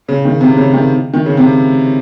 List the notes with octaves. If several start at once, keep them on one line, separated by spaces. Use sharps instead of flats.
C#3
D#3
C3
C#3
D#3
D#3
C#3
C3